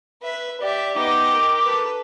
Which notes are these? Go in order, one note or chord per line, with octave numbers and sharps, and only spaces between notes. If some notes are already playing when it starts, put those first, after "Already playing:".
B4 E5
G4 D5 E5
B3 D#4 G4 D#5 D6
A#4
A4 B4